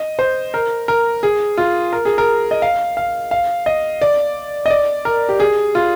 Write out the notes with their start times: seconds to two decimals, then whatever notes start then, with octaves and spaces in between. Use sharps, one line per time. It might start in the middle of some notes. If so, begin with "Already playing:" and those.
Already playing: D#5
0.19 C5
0.54 A#4
0.88 A#4
1.23 G#4
1.57 F4
1.93 A#4
2.05 G#4
2.18 A#4
2.51 D#5
2.62 F5
2.97 F5
3.31 F5
3.66 D#5
4.02 D5
4.66 D#5
4.70 D5
5.05 A#4
5.29 G4
5.40 G#4
5.75 F4